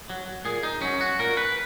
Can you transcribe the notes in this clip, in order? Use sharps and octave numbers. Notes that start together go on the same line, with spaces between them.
F#3
A#2 G#4
D#4
F#3 C#4
F#4
A#2 A#4
B4